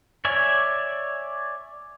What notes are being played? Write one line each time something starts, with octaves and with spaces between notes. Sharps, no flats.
C#5 D5 E5 G#5